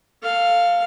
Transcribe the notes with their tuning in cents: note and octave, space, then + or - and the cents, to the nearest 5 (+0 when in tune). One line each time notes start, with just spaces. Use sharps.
A4 +30 F5 +0